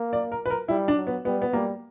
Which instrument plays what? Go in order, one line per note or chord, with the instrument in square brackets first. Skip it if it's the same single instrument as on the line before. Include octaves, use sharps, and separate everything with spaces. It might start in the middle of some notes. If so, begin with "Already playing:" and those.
Already playing: [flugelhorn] A#3
[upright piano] D5
A#4
B4
A#4
[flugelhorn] G3 [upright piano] E4
[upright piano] D4
[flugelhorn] F#3
[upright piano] B3
[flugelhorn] G3 [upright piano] B3
[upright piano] B3
[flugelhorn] G3 [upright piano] A#3